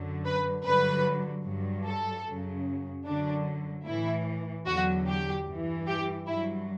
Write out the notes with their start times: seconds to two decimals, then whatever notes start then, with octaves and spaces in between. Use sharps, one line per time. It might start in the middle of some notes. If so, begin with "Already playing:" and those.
Already playing: F#2 D3 F#3
0.26 B4
0.65 G2 D3 F#3 B4
1.45 G2 F#3
1.86 A4
2.26 F#2 C#3 F#3
3.05 F#2 D3 F#3 D4
3.85 A2 E3 E4
4.66 E2 D3 F#3 F#4
5.07 G4
5.46 G2 E3
5.87 G4
6.27 G2 F#3 E4